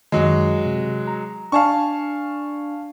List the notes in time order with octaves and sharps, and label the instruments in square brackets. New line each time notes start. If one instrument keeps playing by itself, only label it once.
[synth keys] F#2 D#3 [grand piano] F#3 G#3
[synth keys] C3
A#5
[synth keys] D4 D5 G#5 [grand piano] F5 A5 C#6